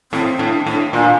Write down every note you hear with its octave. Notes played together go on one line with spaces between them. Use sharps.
A2 C4
A2 D4
A2 D4
A#2 D4